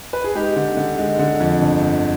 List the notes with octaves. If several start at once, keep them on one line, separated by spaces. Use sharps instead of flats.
B4
G#4
G#3 D#4 G4
D3
D3
G#3
D3
F2
G1
D3